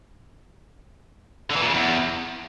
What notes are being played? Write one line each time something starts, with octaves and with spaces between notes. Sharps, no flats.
D3
E3
A#2
C#3
E2